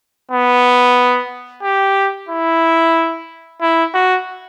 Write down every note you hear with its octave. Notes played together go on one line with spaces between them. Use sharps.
B3
G4
E4
E4
F#4